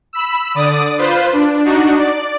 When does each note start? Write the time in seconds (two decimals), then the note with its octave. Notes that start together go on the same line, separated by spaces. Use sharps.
0.13 B5 E6
0.55 D3 D5 D#6
0.98 F4 B4 C5
1.33 D4
1.65 D4 D#4 F#4
1.99 D5